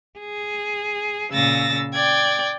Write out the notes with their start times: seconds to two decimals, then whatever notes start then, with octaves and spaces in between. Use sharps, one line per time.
0.19 G#4
1.34 A#2 C#3 E6 A6 A#6
1.94 D5 G5 G#6